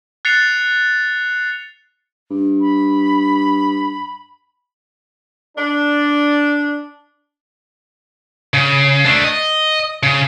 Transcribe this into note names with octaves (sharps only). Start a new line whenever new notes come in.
F#6 A6 C7 C#7 F7
G2
B5
D4
C#3
A3 D4
D#5
C#3